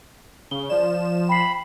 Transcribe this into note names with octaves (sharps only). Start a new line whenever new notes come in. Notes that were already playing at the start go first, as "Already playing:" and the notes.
C#3 G7
F3 D5 E7
G5 B5 C7